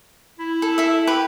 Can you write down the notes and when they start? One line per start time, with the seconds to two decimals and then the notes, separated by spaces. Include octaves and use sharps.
0.39 E4
0.62 A4
0.78 A4 E5
1.07 G4 B4